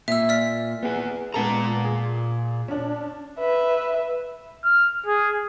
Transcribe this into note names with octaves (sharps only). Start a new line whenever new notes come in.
A#2 E5 E6
D5 F6 B6
B3 G#4
A#2 G#3 B3 A4 A#5
G#4
C#4 D4
B4 E5
F6
G#4